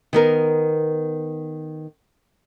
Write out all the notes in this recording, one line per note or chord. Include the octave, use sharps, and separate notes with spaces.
D#3 B3 A#4